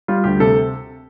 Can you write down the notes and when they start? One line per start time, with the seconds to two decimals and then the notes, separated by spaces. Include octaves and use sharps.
0.08 G3 F4
0.24 D2 G4
0.40 C3 A4